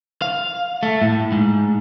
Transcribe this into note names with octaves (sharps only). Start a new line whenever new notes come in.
F5
A3
A2
G#2